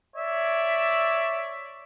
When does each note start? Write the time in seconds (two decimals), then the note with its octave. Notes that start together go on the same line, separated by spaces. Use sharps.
0.15 C#5 D5 E5